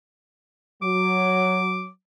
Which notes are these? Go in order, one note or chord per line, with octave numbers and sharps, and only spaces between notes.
F#3 D6